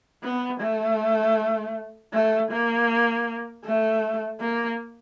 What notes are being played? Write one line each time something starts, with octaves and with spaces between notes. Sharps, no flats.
B3
A3
A3
A#3
A3
A#3